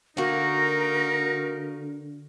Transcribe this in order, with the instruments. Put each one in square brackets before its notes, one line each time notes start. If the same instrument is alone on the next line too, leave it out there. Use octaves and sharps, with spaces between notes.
[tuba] D3 [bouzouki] A#3 F#4 [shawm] D#4 [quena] A#4